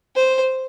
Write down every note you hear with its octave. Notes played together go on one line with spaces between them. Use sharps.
C5